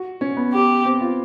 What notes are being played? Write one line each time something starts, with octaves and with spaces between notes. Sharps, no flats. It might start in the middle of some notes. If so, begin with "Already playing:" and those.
Already playing: F#4
C#4
B3
G4
C4
F4